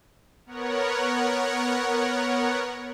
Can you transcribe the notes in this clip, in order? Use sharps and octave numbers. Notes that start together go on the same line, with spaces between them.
B3 A#4 C#5 F#5